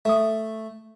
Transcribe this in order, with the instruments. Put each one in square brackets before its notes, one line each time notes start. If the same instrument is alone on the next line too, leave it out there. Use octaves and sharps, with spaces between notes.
[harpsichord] A3 [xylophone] E5 D#6